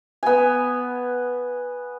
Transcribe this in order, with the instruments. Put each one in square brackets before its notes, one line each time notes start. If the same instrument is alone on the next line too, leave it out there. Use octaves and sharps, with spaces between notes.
[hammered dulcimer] B3 G#5